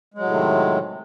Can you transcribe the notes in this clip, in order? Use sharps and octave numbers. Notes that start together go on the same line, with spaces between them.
A2 C3 D#3 F#3 G#3